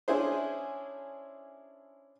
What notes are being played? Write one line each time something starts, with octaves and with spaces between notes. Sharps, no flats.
C#4 D4 E4 G#4 C5